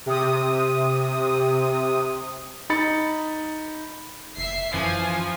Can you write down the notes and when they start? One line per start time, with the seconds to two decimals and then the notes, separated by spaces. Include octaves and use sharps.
0.06 C3 D#6
2.70 D#4 B5 A6 C#7
4.37 F#1 E5 C7
4.74 F#2 E3 F3 B4 G#5